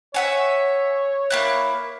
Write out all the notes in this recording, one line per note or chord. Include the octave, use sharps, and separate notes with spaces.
C#5 E5 F#5 G#5
A#3 E4 F#6